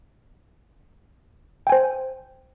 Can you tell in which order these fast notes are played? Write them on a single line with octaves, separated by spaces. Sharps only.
G5 G#5 C5